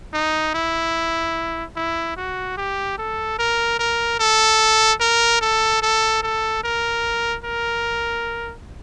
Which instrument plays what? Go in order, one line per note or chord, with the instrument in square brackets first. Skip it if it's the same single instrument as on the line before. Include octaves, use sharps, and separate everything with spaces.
[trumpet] D#4
E4
E4
F#4
G4
A4
A#4
A#4
A4
A#4
A4
A4
A4
A#4
A#4